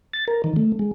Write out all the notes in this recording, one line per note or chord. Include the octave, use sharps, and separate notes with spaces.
A6
A#4
D#3
A3
G#3